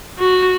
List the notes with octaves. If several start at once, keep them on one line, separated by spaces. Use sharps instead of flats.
F#4